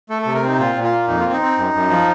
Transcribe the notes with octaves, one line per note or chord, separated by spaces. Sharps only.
A3 A4
C3 A4
A#4
C4 D#4
A#2 F4
A#2
F4
A#3
F2 D#4
F4
C4
D#4
C4
F#2
F#2
F3